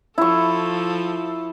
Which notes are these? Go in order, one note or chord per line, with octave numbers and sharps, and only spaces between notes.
F3 E4 A4 C#6